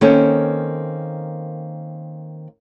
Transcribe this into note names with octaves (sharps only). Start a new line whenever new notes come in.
D#3 A#3 C4 C#4 A4 C5